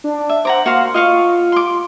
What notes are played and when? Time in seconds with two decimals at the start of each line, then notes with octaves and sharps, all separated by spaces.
0.04 D4
0.29 E5
0.45 C5 F#5 A#5 D6
0.66 A#3 F#4 F5 C6
0.94 F4 D#5 F5 C#6
1.52 C6 D6